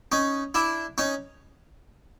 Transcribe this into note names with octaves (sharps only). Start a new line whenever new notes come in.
C#4 D#4
D4 E4
C#4 D#4